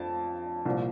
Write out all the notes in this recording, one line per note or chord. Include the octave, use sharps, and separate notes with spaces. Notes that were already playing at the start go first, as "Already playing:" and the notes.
Already playing: F2 A5
C2 A#2 F3